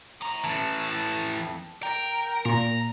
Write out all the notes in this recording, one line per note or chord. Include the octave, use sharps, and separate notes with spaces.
A2 A#5
F2 A2 E3 A5
A#4 G5
A#2 A#5